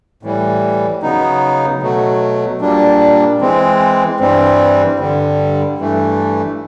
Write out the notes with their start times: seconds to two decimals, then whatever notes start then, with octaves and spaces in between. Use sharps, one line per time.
0.23 A2 E3 G3
1.02 C#3 F#3 B3 D#4
1.81 B2 F#3 A3
2.61 A#2 G3 A#3 D4
3.41 E3 G#3 C4
4.20 G2 E3 G3 C4
4.99 G2 D3 G3
5.78 G2 E3 A3